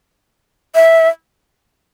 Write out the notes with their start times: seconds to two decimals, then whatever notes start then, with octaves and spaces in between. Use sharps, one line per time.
0.75 E5